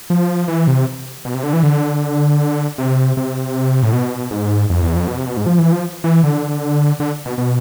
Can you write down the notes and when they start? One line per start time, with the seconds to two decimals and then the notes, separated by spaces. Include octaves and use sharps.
0.10 F3
0.48 E3
0.67 C3
1.25 B2
1.34 C3
1.43 D3
1.53 E3
1.63 D3
2.78 C3
3.17 C3
3.83 A2
3.93 B2
4.31 G#2
4.70 F2
4.83 E2
4.95 F2
5.08 B2
5.17 C3
5.27 B2
5.37 G#2
5.46 F3
5.59 E3
5.72 F3
6.04 E3
6.23 D3
7.00 D3
7.25 B2
7.38 B2